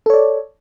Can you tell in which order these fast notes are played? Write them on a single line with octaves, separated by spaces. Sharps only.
A4 C#5 D5